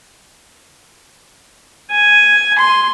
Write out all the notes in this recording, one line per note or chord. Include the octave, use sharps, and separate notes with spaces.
G#5
C6